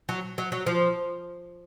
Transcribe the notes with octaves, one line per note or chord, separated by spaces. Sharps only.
F#3
F#3
F#3
F3